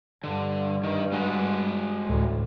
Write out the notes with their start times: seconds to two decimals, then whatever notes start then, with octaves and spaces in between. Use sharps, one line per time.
0.24 G2 D3
0.83 D#3
1.12 G#3 F#4
2.06 A1 D2 A2